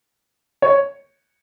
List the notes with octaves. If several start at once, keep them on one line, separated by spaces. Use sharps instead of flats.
C#5